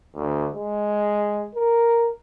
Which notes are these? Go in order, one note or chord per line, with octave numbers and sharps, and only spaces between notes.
D2
G#3
A#4